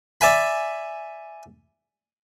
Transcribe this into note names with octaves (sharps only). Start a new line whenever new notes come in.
D5 E5 G#5 B5